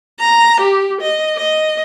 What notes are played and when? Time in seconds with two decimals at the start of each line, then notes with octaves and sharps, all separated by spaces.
0.20 A#5
0.61 G4
1.01 D#5
1.37 D#5